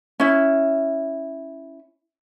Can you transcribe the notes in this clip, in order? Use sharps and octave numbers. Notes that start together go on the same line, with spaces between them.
C#4 E4